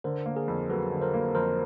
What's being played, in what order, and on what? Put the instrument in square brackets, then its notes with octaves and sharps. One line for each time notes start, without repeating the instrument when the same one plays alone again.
[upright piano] D3 [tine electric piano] A#4 C5
[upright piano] A#3
[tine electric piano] G#4 A#4
[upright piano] F2
[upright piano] F#3 [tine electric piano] A4 B4
[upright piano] D3
[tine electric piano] A#4 C5
[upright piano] A#3
[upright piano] F2 [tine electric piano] A#4 C5